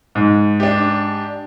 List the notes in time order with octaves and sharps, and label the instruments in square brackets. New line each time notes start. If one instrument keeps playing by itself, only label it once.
[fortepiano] G#2
[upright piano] D4 G4